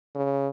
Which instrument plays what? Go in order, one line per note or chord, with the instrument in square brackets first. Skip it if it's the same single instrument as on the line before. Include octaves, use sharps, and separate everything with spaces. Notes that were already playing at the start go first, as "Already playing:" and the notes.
[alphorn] C#3